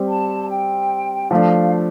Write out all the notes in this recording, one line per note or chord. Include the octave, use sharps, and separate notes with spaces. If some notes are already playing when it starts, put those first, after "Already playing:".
Already playing: G3 C4 G4
A5
G5
F3 A3 D4 F5